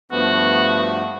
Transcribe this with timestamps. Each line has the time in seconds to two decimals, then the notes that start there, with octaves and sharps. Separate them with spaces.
0.12 G2 F3 A3 B3 F#4